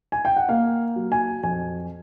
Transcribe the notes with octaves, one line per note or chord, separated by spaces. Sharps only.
G#5
G5
F#5
A#3 F5
F#3
G#5
F2 G#5